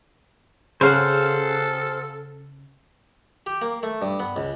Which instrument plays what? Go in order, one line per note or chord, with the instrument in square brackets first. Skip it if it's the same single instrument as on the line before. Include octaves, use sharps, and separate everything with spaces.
[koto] C#3 [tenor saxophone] A4 [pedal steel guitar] C5 F5 F#5
[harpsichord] G4
A#3
A3
G2
B3
C#2